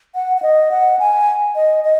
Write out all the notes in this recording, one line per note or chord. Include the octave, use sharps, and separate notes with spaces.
F#5
F#5
D#5
F#5
G#5
D#5
D#5